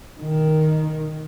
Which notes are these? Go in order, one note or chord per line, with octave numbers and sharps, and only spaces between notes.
D#3